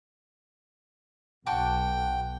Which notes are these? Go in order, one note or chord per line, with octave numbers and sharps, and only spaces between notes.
B1 F#4 G5 A5 D6